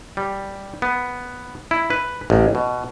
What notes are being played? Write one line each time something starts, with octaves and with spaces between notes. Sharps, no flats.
G3
B3
E4
B4
A1
B2